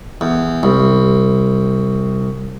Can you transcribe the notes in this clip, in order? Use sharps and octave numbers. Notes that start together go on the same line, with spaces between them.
E2
C2